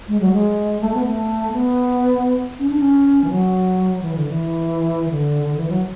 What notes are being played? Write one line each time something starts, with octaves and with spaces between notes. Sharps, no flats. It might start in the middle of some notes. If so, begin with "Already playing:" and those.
G#3
F#3
G#3
A3
B3
A3
B3
C#4
D4
C#4
E3
F#3
E3
D3
E3
D3
D3
E3
F#3